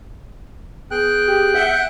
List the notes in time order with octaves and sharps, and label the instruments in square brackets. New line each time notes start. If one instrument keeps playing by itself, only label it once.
[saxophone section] B3 G#4 [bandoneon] G5 F#6
[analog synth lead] G4
[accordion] E5 F#5 [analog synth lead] G6